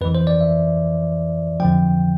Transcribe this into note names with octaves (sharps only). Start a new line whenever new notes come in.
F2 E3 B4
C5
D5
E5
F2 D3 F3 G5